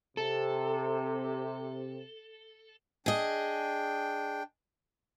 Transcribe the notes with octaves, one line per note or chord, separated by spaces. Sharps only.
C3 A4
D4 G#4 D#5 G5